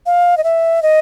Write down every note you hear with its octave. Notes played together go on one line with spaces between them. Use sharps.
F5
D#5
E5
D#5